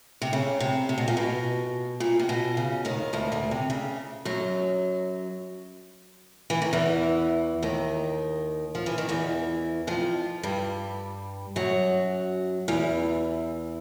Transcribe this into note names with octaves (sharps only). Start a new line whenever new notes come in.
C3
C#3
C3
C3
B2
A#2
B2
A#2
C3
B2
C#3
D#2 D#3
D2 D3
D2 D3
C3
C#3
F#2 F#3
E3
D#3
E2 E3
D#2 D#3
F3
E3
D#3
E2 E3
F2 F3
G2 G3
F#2 F#3
E2 E3